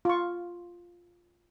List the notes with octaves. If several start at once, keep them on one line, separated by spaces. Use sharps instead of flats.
F4 C#6